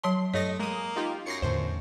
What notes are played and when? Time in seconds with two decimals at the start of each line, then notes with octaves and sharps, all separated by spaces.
0.04 F#3 C#5 A5 C6
0.34 G2 A3 C#5 D#5 A#6
0.59 G#3 A#3 D#6
0.96 D#4 F4 G4
1.26 F#2 A#6 C7 C#7
1.42 E2 A2 D3 C5